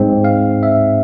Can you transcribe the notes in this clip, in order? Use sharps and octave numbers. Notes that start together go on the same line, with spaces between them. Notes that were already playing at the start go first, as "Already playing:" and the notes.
Already playing: G#2 G#3 C4
F5
E5